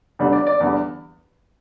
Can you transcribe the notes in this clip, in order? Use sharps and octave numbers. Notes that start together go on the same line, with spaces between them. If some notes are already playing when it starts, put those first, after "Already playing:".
E2 D3 G3
D5
D5
E2 D3 G3